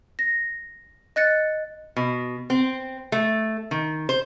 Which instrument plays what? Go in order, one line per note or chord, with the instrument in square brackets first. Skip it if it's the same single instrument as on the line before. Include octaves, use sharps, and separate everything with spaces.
[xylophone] A#6
D#5 F#6 A6 C#7
[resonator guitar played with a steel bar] B2
C4
A3
D#3
C5